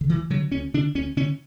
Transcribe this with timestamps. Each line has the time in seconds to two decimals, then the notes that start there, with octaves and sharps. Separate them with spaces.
0.01 D3
0.08 D2 E3
0.30 D3 F#3
0.52 D2 C#4
0.74 D3 D4
0.95 D2 C#4
1.17 D3 C#4